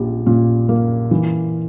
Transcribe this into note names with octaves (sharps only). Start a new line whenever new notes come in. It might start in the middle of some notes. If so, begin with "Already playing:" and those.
Already playing: A#1 G3
A#2
A#3
E3